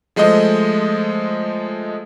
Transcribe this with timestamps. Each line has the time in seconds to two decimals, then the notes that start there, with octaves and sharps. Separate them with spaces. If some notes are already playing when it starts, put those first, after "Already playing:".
0.16 F3 G#3 A3 C5 D#5